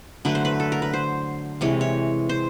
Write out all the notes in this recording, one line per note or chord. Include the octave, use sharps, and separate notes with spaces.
D3 F#3 A3 B4
C5
B4
A4
A#4
B4
C5
C3 E3 G#3 C#5
C#5
C5